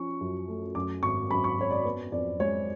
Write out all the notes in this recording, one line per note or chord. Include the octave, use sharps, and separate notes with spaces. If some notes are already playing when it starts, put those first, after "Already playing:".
Already playing: F3 C#4 C#6
F#2
A3
F#2 D6
G#1 C#6
F#2 B5
C#6
F#2 C#5
D5
B3
F2 D5
G#3 C#5